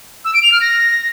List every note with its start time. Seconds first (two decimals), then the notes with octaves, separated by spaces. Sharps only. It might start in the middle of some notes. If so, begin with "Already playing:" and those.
0.24 E6
0.33 D7
0.42 F7
0.52 F6
0.61 A#6